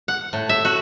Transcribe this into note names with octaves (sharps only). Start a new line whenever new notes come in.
F#5
A2
E5
F#4